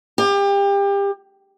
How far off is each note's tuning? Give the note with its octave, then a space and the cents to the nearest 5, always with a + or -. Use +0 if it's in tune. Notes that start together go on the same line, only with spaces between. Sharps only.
G4 +30